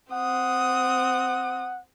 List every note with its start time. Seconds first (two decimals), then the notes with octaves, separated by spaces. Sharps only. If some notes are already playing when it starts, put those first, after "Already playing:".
0.13 C4 F#5 D#6